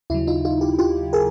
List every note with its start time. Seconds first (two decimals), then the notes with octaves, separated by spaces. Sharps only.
0.10 D#2 C#3 F#3 E4
0.27 D#4 F4
0.45 D#4 F4
0.61 F4 G4
0.79 F4 G4
1.13 G#4 A#4